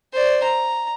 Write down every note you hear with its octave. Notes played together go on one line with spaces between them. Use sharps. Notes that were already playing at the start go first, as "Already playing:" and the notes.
C5 D5
A#5